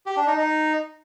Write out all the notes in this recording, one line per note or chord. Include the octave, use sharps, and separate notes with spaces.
G4
D4
D#4
D#4